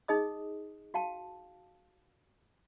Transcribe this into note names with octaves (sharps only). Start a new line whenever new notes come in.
D#4 G#4 D#5 D#6
F#4 F5 G5 A5